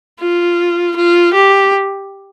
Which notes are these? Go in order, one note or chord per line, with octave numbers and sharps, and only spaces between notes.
F4
F4
G4